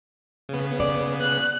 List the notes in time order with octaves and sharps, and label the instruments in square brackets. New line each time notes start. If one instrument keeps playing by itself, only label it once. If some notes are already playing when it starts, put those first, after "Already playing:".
[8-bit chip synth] C#3 B3
[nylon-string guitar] D5
[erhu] F#6